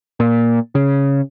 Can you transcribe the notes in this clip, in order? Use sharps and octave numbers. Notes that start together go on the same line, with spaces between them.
A#2
C#3